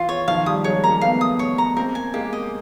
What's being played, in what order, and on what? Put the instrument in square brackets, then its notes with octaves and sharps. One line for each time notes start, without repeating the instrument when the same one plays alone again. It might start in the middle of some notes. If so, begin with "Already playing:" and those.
Already playing: [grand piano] E3 [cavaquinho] F4
[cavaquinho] C#5
[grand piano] D#3 F3 [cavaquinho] F5
[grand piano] F3 G3 [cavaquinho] D#6
[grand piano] F#3 G#3 [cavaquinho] C#5
[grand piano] G#3 A#3 [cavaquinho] A#5
[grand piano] A3 B3 [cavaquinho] F5
[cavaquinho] D#6
C#5
A#5
[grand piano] A#3 C4 [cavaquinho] A#4
[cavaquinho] G#5
[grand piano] G#3 A#3 [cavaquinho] G4
[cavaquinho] D#5